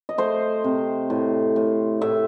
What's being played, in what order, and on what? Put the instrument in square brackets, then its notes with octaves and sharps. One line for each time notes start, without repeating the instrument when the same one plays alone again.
[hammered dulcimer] D#5
A3 C5
C3
A2
A2
A2 E5